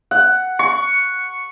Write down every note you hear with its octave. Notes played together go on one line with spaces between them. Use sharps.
F#5
C#6